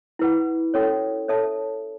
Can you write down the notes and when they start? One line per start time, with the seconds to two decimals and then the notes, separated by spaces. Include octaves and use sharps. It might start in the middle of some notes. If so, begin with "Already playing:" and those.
0.19 E4 B4 F#5
0.74 C#4 F#4 A4 C#5
1.28 A4 C#5 E5 A5